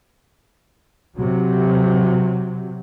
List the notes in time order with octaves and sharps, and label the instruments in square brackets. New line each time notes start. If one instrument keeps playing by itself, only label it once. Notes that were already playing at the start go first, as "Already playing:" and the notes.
[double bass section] C3 F#3